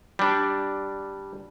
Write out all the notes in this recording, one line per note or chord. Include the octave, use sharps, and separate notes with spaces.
G3 D4